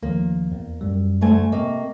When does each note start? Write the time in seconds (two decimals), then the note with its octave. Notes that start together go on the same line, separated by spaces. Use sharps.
0.03 D#2 D#3 F3 A#3
0.52 E2
0.81 F#2 G3
1.21 D2 A3 G#5
1.52 C3 A#3 D#5 C#6